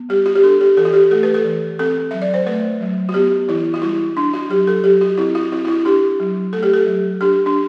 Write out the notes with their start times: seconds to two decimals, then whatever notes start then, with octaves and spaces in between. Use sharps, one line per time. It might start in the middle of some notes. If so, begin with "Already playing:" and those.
Already playing: B3
0.09 G3 G4
0.26 F#4
0.35 G4
0.43 D4 A4
0.61 G4
0.77 E3 A4
0.85 F#4
0.93 G4
1.11 A3 A4
1.23 B4
1.34 A4
1.45 E3
1.79 C4 A4
2.11 F#3 E5
2.22 D5
2.34 C5
2.46 A3 B4
2.81 F#3
3.09 F#4
3.14 B3 G4
3.48 E3 E4
3.74 F#4
3.82 G3 E4
4.17 D4
4.33 F#4
4.49 F#3 G4
4.67 A4
4.84 F#3 G4
5.01 F#4
5.17 C4 E4
5.35 F#4
5.51 C4 E4
5.65 F#4
5.68 E4
5.85 D4 G4
6.20 F#3
6.53 A3 A4
6.63 G4
6.73 A4
6.87 F#3
7.21 D4 G4
7.46 D4